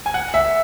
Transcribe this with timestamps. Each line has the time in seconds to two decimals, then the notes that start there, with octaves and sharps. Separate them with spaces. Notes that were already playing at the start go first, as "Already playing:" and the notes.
0.06 G#5
0.14 F#5
0.34 E5